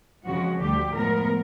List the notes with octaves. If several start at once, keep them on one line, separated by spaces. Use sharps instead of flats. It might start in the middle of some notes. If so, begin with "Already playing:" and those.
F2 C#3 F3 G#3 F#4
D2 D3 G3 G4
A2 F3 G#3 B3 A#4